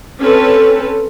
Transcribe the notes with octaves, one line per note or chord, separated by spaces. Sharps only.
C4 C#4 A4 B4